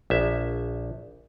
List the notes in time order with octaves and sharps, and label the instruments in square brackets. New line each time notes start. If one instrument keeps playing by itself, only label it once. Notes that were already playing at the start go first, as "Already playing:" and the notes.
[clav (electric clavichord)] A#1 E5